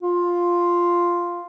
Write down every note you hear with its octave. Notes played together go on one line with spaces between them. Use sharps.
F4